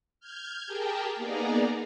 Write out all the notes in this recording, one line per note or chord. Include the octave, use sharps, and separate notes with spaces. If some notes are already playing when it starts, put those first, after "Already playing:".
F6 G6 G#6
G4 G#4 A#4 G5 A5
A#3 B3 D#4 G#4 D5 A#5